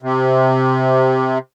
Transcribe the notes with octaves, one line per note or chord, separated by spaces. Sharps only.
C3